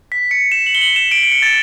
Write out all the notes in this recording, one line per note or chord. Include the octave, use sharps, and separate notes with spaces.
B6
C#7
E7
F#7
G7
F#7
E7
D7
D7
C#7
A6